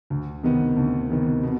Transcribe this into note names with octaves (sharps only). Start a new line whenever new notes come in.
D2
C3 D#3 B3
D2
C3 D#3 B3
B2